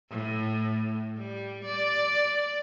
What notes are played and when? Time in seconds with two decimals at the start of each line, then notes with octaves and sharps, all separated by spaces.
0.11 A2
1.17 G3
1.65 D5